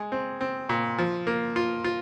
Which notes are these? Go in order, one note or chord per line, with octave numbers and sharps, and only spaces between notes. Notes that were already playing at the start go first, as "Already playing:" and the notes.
Already playing: G#3
C4
C4
A#2
F3
A#3
F4
F4